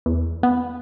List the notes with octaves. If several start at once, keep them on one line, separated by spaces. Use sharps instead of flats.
E2
B3